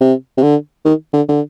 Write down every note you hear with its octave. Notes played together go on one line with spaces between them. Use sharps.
C3
C3
D3
D#3
D3
D3